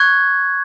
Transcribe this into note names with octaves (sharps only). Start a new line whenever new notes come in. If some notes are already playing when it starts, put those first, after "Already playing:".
Already playing: C#6 F#6 G#6